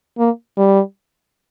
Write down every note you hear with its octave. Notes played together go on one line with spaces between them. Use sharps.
A#3
G3